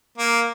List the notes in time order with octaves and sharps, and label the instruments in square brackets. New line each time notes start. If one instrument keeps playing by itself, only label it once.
[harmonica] A#3